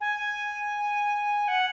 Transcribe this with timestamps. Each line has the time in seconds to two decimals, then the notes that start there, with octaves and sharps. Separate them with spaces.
0.01 G#5
1.48 F#5